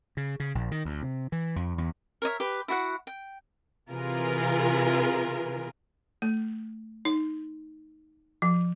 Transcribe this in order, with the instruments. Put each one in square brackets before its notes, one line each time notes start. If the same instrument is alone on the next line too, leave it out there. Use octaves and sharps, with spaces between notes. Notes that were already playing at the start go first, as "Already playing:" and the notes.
[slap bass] C#3
C#3
A#1
D#3
D2
C3
E3
F2
E2
[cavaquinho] A#4 C#5 D#5 E5
G4 B4
E4 F#4 F#5
G5
[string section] C3 E3 F4 G#4 A#4 B4
[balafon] A3
D#4
F3